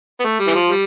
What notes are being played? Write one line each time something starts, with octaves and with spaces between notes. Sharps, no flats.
B3
A3
G3
E3
F3
G3